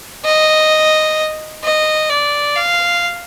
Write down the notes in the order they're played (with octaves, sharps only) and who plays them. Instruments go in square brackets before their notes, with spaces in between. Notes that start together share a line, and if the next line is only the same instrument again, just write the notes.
[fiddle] D#5
D#5
D5
F5